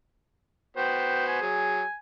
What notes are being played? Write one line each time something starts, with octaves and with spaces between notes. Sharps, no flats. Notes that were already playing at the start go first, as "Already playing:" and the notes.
B3 F#4 C5 G5
G#5
F#3 G#4